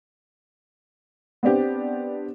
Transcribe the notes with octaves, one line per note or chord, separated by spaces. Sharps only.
B3 C4 D4 G4